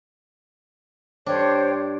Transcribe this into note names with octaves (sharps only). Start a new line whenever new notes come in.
G2 D4 C5 C#5 G5